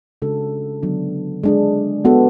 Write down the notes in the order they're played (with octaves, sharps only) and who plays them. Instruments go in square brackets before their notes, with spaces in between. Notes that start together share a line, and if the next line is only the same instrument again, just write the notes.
[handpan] C#3 G#3 D4 F#4 A4
D3 F#3 B3 D4
G#3 D4 G#4
G#3 B3 F#4 A4